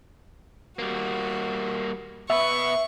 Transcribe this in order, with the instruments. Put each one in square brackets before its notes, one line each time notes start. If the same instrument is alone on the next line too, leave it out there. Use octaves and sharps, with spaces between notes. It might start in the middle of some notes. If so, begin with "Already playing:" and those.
[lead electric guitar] G3 A#3 [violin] F#4
[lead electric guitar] B2 B4 [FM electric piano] E5 [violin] C#6